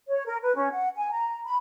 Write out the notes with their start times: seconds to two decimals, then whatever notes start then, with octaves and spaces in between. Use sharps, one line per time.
0.07 C#5
0.27 A#4
0.44 B4
0.55 C#4
0.72 F#5
0.96 G#5
1.12 A#5
1.44 B5